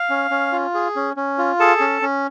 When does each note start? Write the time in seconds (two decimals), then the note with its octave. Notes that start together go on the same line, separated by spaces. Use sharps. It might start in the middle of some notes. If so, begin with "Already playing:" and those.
Already playing: F5
0.10 C#4
0.31 C#4
0.52 F4
0.74 G#4
0.96 C#4
1.16 C#4
1.38 F4
1.60 G#4 A4 A5
1.81 C#4
2.02 C#4